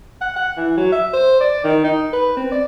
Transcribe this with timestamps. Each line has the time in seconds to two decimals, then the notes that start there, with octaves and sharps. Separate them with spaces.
0.21 F#5
0.36 F#5
0.57 E3
0.77 F#3
0.92 E5
1.13 C5
1.41 D5
1.64 D#3
1.84 D#4
2.13 B4
2.37 C4
2.52 D5